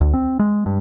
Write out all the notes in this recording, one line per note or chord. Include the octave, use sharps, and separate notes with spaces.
D2
C4
G#3
G2